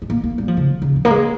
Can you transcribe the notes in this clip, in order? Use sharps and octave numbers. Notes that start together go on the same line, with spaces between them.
G#3
A#3
A#3
G3
F3
C#3
C#3
F3
A#3
G#3